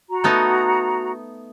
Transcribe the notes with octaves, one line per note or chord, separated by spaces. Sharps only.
F#4 A#5
A3 B3 D#4